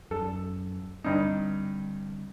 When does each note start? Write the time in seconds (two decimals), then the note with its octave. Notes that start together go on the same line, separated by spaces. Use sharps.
0.11 F#2 A4
1.04 G2 D3 G3 C4 D#4